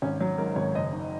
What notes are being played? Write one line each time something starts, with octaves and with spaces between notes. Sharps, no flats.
G#1 C#4
F#3
G#2 A#4
G#1 C#5
F#1 D#5
D#3